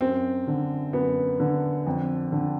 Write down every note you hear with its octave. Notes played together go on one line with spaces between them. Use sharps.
F#2 C4
D3
F#2 B3
D3
F2
D3